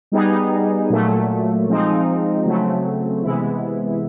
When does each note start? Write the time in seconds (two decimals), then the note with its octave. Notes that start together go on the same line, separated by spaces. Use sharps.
0.12 G3 B3 D#4 G#4
0.90 A#2 F#3 A3
1.67 F3 G#3 C4 D#4
2.45 C#3 F#3 A3 C4
3.22 C3 E3 G#3 B3 E4